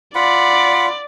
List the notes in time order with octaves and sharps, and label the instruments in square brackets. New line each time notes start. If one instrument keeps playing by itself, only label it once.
[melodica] F4 [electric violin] D5 [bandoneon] F#5 B5